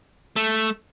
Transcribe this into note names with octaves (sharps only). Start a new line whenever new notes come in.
A3